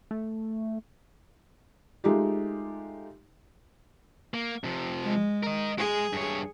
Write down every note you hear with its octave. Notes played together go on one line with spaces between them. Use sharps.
A3
G#3 A3 D#4 F4 G4
A#3
C3 F3
G#3
A#4 D#5
G#3 G#4
G2 C#5